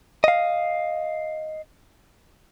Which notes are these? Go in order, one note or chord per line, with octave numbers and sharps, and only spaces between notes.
D#5 F5